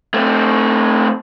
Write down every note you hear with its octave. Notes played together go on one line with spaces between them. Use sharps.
A3 C4